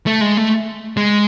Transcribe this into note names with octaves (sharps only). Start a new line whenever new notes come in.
A3
G#3
A3
G#3